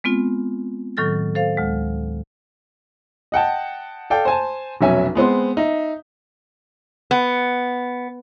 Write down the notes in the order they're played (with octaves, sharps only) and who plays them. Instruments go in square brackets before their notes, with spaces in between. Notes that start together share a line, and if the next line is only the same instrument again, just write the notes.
[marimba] G#3 B3 C4 F4
A2 D#3 F#3 A4 F6 A6
A4 C5 F5
D2 G#3
[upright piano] D#5 F#5 G5 A5
A4 D5 F5 G5
C5 G#5 A5
F1 B1 F#3 C#4 E5 G#5
G#3 B3 C4 C6
D#4 E5
[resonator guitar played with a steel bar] B3